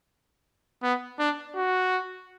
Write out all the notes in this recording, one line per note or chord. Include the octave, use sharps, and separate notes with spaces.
B3
D4
F#4